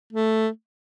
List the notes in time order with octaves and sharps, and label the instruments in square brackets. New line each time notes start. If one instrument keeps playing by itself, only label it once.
[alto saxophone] A3